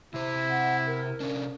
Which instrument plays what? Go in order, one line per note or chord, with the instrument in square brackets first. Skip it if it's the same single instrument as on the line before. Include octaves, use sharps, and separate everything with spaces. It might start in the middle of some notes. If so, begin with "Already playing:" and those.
[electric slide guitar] C3 C5 [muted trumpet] E4
[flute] F#5
A#4
[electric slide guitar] C3 C#4 D4